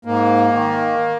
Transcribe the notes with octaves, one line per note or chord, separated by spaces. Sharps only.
G#2 A#3
D#3